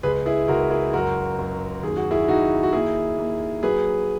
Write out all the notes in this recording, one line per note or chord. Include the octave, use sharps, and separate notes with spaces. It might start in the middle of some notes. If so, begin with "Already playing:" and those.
C#2 G#4 B4
E4 G#4
C#2 F#4 A#4
E4 G#4
F#2 F#4 A#4
F#2
D#2 G#4
F#4
E4 G#4
D#2 D#4 F#4
F#4
A#3 E4 G#4
A#3
F#3 G#4 B4